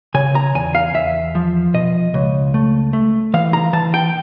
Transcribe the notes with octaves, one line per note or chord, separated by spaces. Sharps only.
C#3 G#5
A#5
E2 G#5
F5
E2 E5
F3
B2 D#5
C#2
A3
A3
E3 F5
A#5
E3 A5
G5